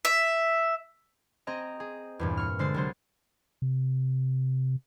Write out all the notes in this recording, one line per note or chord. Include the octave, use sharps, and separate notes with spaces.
E5
C4 G#4 D#5 A#5
G#4
E2 G2 A#2
C#6 F6
D3 G#3 C5 A6 C7
C2 F#3 C5
C3